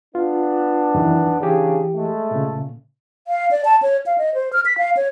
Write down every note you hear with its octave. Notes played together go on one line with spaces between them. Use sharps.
B3 D4 F4
F#2 D#3 E3
C#3 E3 D4 G4 G#4
G#3 A3
A#2 C#3
F5
D5
A5
C#5
F5
D#5
C5
F6
B6
F5
C#5